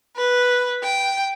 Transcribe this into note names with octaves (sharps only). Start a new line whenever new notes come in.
B4
G5